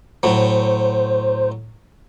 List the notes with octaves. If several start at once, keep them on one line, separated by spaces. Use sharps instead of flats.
A2 F#3 C5